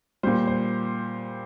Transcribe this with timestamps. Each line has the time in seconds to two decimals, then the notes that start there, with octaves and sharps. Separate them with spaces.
0.23 A#2 G3 C5
0.47 C5